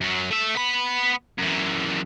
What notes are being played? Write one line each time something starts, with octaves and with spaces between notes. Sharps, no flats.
F#2 F#3
A3 E5
B3 B5
F#2 E3